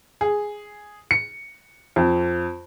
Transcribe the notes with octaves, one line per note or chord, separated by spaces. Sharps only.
G#4
C#7
F2